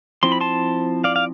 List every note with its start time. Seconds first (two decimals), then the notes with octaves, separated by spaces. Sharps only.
0.23 F3 C4 E4 C6
0.32 B5
0.41 A5 C6
1.04 D5 F5
1.16 F5